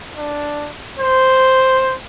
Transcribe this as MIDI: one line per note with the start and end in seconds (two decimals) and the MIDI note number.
0.17 0.69 62
1.00 1.95 72